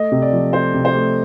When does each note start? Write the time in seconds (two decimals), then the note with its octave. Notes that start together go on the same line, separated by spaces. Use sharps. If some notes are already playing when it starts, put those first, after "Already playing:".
Already playing: A3 D#5
0.12 C3
0.22 D5
0.32 F3
0.53 A3 C5
0.74 C3
0.85 C5
0.95 A3